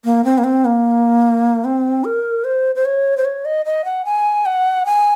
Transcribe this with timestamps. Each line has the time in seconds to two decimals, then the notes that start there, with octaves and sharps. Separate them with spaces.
0.04 A#3
0.24 C4
0.38 A#3
0.44 C4
0.65 A#3
1.64 C4
2.04 A#4
2.44 C5
2.75 C5
2.85 C#5
3.17 C5
3.25 C#5
3.45 D#5
3.65 D#5
3.85 F#5
4.05 G#5
4.46 F#5
4.86 G#5